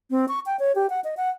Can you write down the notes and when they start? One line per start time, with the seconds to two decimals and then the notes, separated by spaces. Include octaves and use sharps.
0.11 C4
0.28 C#6
0.46 G5
0.59 C#5
0.75 G4
0.90 F#5
1.04 D#5
1.17 F#5